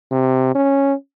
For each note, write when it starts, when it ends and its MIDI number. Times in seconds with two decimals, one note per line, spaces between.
0.12 0.51 48
0.55 0.94 61